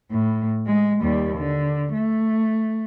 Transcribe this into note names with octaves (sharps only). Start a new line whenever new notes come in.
A2
G#3
D#2 G3
D3
A3